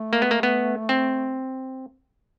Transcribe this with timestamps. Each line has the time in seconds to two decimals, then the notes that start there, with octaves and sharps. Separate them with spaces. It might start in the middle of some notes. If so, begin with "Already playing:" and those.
Already playing: A3
0.13 A#3
0.22 B3
0.31 A#3
0.43 B3
0.89 C4